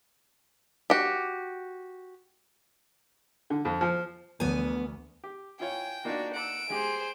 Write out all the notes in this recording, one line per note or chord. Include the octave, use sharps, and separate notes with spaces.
F#4 G4
D3
F2
F3
D2 D3 E3 F3 B3 G#5
G4
E4 F4 C#5 G5 G#5
A#3 D4 D#4 F4 F#4
F#5 E6 D7
G#3 G4 G#4 C5